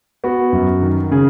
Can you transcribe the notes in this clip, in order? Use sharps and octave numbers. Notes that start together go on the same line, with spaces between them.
B3 F#4
F#2
D#3
C#3 G#4